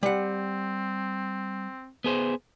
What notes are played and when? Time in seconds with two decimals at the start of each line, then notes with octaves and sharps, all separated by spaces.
0.03 G3 C4 F#5
2.04 B3 G#4 C5